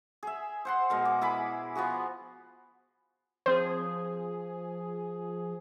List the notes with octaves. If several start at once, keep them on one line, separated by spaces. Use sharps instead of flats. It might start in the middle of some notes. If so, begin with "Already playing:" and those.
G#4 E5
C5 F#5 C6
B2 G#3 A#4
D6
E4 G#4 B5 D6
F3 B3 F#4 G#4
F3 C4 G#4 C5